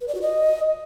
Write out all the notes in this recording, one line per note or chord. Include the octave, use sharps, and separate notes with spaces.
B4
D5
F#4
D#5